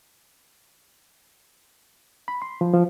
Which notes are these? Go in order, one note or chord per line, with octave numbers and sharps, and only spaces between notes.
B5
C6
F3
F3